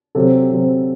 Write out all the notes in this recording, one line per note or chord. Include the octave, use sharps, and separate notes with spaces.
C3 F#3 C4 A4
C3 F#3 C4